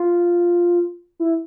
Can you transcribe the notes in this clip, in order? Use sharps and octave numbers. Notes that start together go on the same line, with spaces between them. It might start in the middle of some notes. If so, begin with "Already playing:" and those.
Already playing: F4
E4